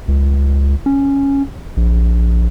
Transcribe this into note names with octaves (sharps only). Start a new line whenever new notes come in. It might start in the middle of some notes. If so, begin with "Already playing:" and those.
C#2
C#4
A#1